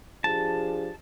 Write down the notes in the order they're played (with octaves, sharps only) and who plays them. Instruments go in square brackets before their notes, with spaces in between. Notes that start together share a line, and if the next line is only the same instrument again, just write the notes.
[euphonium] F3 [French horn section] D4 G4 G#4 [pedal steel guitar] A5